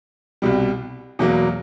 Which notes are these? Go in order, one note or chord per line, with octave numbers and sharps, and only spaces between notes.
C2 B2 G3
E2 B2 F#3 A#3